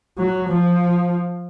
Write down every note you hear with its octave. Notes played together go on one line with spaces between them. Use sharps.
F#3
F3